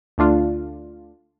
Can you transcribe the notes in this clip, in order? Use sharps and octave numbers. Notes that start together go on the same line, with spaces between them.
D2 A3 D4 F4